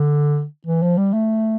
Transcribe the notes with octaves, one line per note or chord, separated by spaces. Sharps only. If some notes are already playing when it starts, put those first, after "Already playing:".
Already playing: D3
E3
F3
G3
A3